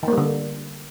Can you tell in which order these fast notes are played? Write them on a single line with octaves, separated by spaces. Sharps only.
D#3 A#3 G3 D3